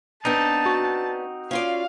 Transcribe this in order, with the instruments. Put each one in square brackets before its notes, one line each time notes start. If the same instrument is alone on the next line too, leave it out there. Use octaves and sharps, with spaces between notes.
[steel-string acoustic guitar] B3 D4 [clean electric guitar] C4 D#4 [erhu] A5
[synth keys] F#4
[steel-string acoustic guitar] C#4 F4 D5 [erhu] F5